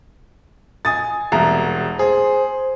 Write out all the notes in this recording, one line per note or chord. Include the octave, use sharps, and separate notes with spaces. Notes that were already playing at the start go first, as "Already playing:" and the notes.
G#5 D#6 A6
E1 C2 A#5
G#4 C5